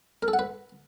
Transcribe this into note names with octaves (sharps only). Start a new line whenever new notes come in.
A#4
A4
F#5
B4